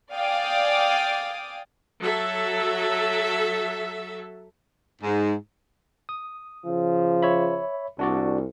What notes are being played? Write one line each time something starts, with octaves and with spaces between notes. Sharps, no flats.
D5 F5 G5 G#5 D6 D#6
F#3 A4 E5
G#2
D#6
C#3 F3
C#5 E5 B5
C2 D4 F#4 D5